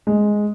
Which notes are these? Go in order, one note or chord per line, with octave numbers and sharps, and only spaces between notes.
G#3